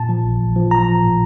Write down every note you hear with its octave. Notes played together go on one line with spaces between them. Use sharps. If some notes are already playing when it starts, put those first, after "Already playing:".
Already playing: A#2 A5
F3
A1
A1
F3
A1 A#5
F3
A2